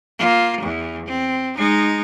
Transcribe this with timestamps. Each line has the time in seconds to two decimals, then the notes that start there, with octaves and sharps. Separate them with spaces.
0.19 A#3 F4
0.61 E2 E3
1.06 C4
1.57 G#3 D#4